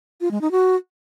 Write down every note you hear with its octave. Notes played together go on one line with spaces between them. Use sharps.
F4
G#3
D#4
F#4